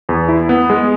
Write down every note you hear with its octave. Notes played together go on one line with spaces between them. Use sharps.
E2
E4
B3
G#3